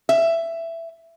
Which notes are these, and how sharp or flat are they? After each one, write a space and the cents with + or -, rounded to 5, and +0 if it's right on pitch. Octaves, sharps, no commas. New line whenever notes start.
E5 +10